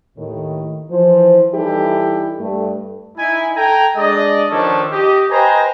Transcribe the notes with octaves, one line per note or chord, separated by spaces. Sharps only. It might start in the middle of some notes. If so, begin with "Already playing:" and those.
D#2 A2 D#3
E3 F3 C5
E3 G3 D#4 E4 G4 A4
G2 A3
D#4 E4 G#5
A4 G5 G#5 A#5
G#3 D4 D5 D#5
D#3 F3 C#4 D4 A4 C#5
G4 D#5
B4 C5 D#5 G5 G#5 A#5